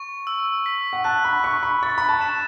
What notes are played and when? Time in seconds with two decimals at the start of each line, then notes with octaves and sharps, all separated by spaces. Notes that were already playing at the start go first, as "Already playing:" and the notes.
Already playing: C#6
0.27 E6
0.66 B6
0.93 F#5
1.04 A5 F#6
1.25 B5
1.44 C#6 F#6
1.63 B5
1.83 C#6 A6
1.98 B5
2.09 A5
2.21 E7